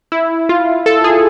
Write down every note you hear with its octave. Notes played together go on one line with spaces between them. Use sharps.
E4
F4
A4
G#4